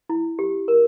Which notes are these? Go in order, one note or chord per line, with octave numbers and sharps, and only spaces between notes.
E4
G4
A#4